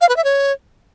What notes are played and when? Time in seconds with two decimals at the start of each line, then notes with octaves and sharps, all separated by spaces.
0.01 F5
0.09 B4
0.16 E5
0.24 C#5